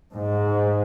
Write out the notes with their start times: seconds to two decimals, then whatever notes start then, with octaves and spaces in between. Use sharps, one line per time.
0.13 G#2